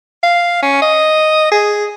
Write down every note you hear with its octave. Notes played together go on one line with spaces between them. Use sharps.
F5
C#4
D#5
G#4